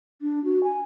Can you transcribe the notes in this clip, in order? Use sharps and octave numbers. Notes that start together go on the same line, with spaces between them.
D4
F#4
G#5